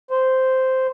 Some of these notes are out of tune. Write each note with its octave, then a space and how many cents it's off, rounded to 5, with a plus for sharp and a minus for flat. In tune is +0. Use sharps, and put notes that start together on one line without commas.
C5 -5